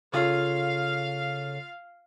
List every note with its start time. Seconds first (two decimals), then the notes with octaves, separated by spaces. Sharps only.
0.14 C#3 F4 A4 C#5 F5